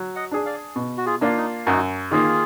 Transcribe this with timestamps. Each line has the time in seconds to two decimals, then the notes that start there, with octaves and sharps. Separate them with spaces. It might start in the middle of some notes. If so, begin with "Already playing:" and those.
Already playing: F#3
0.16 D#5 F#5
0.31 D4 G#4
0.46 D5 F5
0.76 B2
0.98 F#4
1.06 F4 G#4
1.21 A#3 D4 F4
1.37 D#4
1.66 F#2 D#4 F#4
2.11 D#3 A#3 F4 G#4